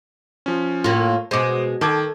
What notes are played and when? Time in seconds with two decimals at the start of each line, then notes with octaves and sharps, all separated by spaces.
0.46 F3 C#4
0.84 A2 A#3 F4
1.31 B2 G#3 C5 D6
1.81 D#3 A4 D6 G#6